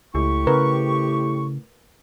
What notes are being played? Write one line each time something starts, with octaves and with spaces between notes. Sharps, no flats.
C#2 A2 G4 C#6
C#3 A#4 B4